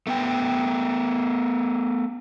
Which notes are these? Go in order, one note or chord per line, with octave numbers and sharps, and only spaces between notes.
A3 B3 G5